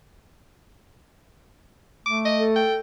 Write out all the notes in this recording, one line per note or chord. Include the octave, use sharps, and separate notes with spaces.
A3 D6
D#5
A4
G5